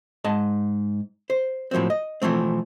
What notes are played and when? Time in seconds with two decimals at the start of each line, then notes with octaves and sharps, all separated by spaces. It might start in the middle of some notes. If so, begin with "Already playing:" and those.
0.25 G#2 D#5 A5
1.30 C5
1.71 A2 F3 F#3 A#3 C4
1.90 D#5
2.22 B2 E3 F3 A3 C4